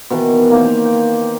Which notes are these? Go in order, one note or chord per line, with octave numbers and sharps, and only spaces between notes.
B2 D#3 E3 B3
A#3 D#4 C5
A#5
G5